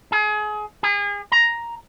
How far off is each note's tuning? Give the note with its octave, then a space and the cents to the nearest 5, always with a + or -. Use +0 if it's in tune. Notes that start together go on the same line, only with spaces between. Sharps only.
G#4 +30
G#4 -35
A#5 +5